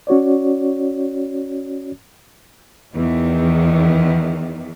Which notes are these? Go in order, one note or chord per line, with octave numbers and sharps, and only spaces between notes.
C#4 F#4 C#5 D5
E2 D#3